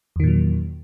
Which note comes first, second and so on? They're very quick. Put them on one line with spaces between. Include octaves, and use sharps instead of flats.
E2 D#3 A#2 F#3